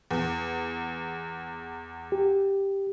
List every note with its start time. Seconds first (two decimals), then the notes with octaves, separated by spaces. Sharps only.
0.11 E2
2.12 G4